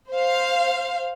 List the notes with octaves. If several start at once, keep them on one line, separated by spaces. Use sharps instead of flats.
C5 F5